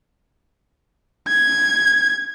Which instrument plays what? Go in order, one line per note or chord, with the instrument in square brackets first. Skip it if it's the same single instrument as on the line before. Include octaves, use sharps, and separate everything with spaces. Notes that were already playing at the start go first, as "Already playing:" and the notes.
[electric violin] G#6